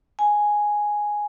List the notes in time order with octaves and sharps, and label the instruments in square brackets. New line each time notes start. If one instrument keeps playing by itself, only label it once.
[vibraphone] G#5